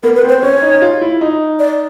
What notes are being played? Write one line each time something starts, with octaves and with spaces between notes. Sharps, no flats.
B3 A#4
B4
C4
C5
C#4 C#5
D#4
F4
E4
D#4
D5